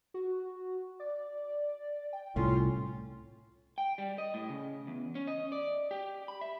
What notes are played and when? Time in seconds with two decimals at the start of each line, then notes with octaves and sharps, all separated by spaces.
0.14 F#4
1.00 D5
2.13 G5
2.36 C2 A2 C#4 F4
3.78 G5
3.98 G3
4.18 D#5
4.34 A2
4.49 C#3
4.87 E2
5.15 C#4
5.27 D#5
5.52 D5
5.91 G4
6.28 B5
6.41 E5